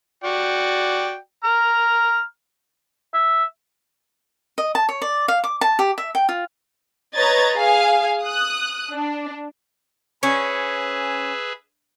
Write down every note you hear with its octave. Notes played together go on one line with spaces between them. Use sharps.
F#4 D5 G5
A#5 F6
E5
D#5
A5
C#5
D5
F5
D6
A5
G4
E5
G5
F4
B4 C#5 D#5 A#5 G#6 A6
G#4 F5 G#5
D#6 F#6
D4
C#4 G#4 B4 E5